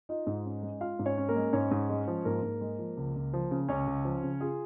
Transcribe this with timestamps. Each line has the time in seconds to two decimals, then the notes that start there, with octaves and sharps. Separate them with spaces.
0.09 D#4 F4 D#5
0.27 G#2
0.45 C#4
0.63 G#3
0.81 F4 F5
0.99 G#2
1.06 C#4 C#5
1.18 C#4
1.29 A#3 A#4
1.36 G#3
1.53 G#2 C#4 C#5
1.71 G#2
1.89 G#3
2.08 F3
2.25 G#2 A#3 A#4
2.43 G#2
2.61 G#3
2.79 F3
2.97 C#2
3.16 C#2
3.33 F3
3.51 C#3
3.69 C#2 C#4 C#5
3.87 C#2
4.05 F3
4.23 C#3
4.41 F4 G#4